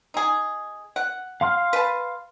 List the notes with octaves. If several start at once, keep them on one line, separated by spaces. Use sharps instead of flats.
D#4 G#4
F#5
F5 C6 F6
B4 A5